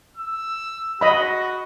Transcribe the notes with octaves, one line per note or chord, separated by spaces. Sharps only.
E6
F#4 D#5 B5